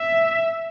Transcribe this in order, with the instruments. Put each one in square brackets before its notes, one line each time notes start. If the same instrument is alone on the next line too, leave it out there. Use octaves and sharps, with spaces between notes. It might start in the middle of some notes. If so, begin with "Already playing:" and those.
Already playing: [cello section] E5